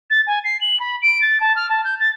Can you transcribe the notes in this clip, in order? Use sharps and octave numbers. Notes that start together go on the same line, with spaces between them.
A6
G#5
C7
F#7
B5
D7
A6
A5
F6
A5
G6
A6